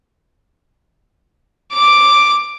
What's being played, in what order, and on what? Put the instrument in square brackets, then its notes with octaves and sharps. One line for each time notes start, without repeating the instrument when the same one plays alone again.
[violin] D6 D7